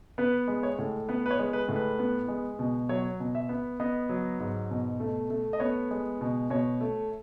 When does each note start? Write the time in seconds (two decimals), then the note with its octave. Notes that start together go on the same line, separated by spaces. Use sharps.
0.18 B3 B4
0.48 G#3
0.63 C#5
0.79 A2
1.09 B3 B4
1.26 B4
1.30 C#5
1.39 G#3
1.53 B4
1.68 A2
1.76 B4
1.99 B3
2.28 G#3
2.59 B2
2.89 F#3 C#5
3.20 B2
3.35 E5
3.49 B3
3.80 B3 D#5
4.09 F#3
4.40 G#2
4.70 B2
5.00 A3
5.30 A3
5.53 D#5
5.60 B3 C#5
5.91 G#3
6.21 B2
6.50 B2 C#5
6.81 A3